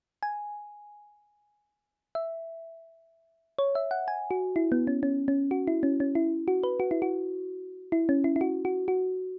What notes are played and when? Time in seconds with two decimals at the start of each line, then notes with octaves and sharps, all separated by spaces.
0.23 G#5
2.15 E5
3.59 C#5
3.75 E5
3.91 F#5
4.08 G#5
4.31 F#4
4.56 E4
4.72 B3
4.87 C#4
5.03 C#4
5.28 C#4
5.51 F#4
5.67 E4
5.83 C#4
6.00 C#4
6.15 E4
6.48 F#4
6.63 B4
6.80 F#4
6.91 E4
7.02 F#4
7.92 E4
8.09 C#4
8.24 E4
8.36 E4
8.41 F#4
8.65 F#4
8.88 F#4